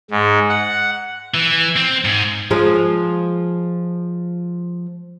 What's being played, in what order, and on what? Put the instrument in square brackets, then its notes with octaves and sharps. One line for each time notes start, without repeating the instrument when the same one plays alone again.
[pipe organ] G#2
F#5
[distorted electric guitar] E3
C4
G#2
[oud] F3 G#3